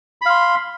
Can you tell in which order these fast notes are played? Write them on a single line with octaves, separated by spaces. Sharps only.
B5 F5 C6